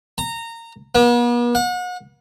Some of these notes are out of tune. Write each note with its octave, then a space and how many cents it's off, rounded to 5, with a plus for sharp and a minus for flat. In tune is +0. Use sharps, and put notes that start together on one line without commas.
A#5 -20
B3 -45
F#5 -35